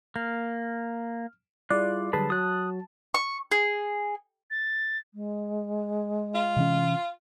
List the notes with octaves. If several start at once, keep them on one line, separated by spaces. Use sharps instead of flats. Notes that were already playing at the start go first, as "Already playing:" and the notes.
A#3 F6
G3 E4 F4 G#4 D5 F#6
D3 F#3 G3 G#4 B4 A5
F#3 F#4 D#6 F#6
C#6
G#4
A6
G#3
F4
C3 E3 C#4